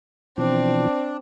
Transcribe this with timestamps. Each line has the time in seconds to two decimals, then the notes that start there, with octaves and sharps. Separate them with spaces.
0.38 B2 E3 F3 C4 D4